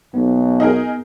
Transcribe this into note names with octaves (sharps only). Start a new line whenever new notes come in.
B1 B3
D#4 G#4 A#4